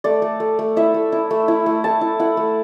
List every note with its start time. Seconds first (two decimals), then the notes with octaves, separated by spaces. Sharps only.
0.04 A3 D5
0.22 A3
0.40 A3
0.59 A3
0.76 E4 E5
0.94 A3
1.12 E4
1.31 A3
1.48 E4
1.66 A3
1.84 A3 A5
2.01 E4
2.19 E4 F#5
2.37 A3